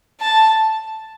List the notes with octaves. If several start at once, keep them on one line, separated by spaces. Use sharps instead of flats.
A5